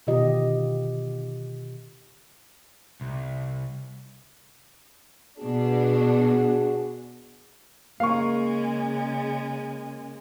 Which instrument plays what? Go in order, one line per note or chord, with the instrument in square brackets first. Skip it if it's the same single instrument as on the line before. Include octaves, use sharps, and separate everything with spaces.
[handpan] B2 D3 D#3 F4 G4 D#5
[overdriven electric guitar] C2
[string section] B2 B3 D4 [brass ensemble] F#4 G#4
[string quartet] C#3 G#3 [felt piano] A#3 [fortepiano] F5 C#6